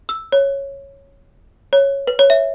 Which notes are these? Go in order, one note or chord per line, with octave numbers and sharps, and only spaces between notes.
E6
C#5
C#5
B4
C#5
E5